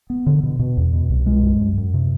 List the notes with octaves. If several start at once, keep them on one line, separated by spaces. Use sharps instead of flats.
B3
D3
B2
B2
E2
B2
C2
G#3
F#2
F#2
F#2
C3